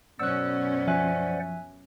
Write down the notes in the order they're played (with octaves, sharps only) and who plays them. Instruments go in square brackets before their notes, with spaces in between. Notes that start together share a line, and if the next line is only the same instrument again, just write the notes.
[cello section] F#2 B2 C#4 [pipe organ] C5 D5 F#5 [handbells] E6 F#6
[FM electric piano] F3 [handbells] E5 G#5 F#6